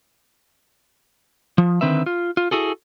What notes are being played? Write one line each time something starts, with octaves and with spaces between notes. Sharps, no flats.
F3
D3 D#3 C4 B4 E5
F4
F4
E4 F#4 G#4 A4